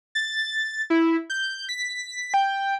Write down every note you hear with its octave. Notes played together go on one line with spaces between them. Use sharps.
A6
E4
G6
B6
G5